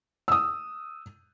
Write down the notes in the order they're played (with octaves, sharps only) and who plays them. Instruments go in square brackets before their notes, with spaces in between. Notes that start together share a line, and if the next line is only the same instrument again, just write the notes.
[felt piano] D#6 E6